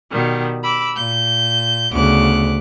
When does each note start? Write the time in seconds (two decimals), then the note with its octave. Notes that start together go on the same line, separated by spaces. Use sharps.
0.12 B2 D#3 G3
0.63 B5 D6 E6
0.96 A#2 G6
1.91 D2 C#3 B3 D6 F#6